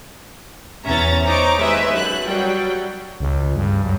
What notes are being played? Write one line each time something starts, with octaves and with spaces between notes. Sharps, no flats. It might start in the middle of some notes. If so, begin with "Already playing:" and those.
E2 C#4 E5 A#5 A6
D#4 C5 C#5 A#5 D6
D#2 G#3 B4 E5
F#2 F#6
F#3 G3 G5
C#2
G2
F#2